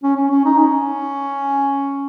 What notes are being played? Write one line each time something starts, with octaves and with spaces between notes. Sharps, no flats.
C#4
C#4
C#4
D#4
C#4